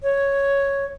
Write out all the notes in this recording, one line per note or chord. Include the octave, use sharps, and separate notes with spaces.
C#5